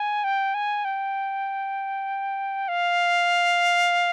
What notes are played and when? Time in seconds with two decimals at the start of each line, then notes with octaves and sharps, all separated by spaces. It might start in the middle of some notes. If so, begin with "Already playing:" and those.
Already playing: G#5
0.24 G5
0.54 G#5
0.85 G5
2.68 F5